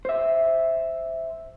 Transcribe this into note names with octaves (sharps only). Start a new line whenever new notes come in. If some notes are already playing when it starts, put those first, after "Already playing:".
C5 E5